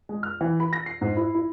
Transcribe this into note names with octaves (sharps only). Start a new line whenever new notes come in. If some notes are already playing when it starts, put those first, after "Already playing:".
G#3
F6
E3
B5
A#6
C7
G#2
E4
E4